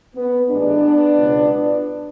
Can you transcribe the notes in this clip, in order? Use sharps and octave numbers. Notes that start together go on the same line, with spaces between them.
B3
A1 G#2 G#3 B3 D4
C#2 B2 F#3